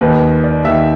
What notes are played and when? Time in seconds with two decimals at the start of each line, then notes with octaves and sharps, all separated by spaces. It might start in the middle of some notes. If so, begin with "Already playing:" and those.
0.01 D#2 D#3 B4
0.44 D5
0.64 D#2 D#3 E5